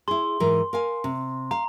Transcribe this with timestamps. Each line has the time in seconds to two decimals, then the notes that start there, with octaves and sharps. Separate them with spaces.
0.08 E4 G#4 C6
0.40 G#2 E3 A#4
0.73 A#4 F5 G#5
1.04 C3
1.51 F5 A#5